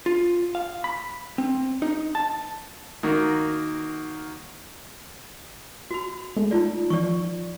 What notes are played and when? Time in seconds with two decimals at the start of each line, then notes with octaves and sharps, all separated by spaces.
0.06 F4
0.55 F5
0.84 B5
1.38 C4
1.82 D#4
2.15 A5
3.03 D#3 A#3 F#4
5.91 F#4 B5
6.37 G#3 A3
6.51 D#4 F4 D5
6.90 E3 F3 D5 C#6